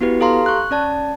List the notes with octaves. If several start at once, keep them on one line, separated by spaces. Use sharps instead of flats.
B3 E4 F#4 G4 B4
G4 A4 F5 A#5 C6
C#6 F#6
C#4 D5 A5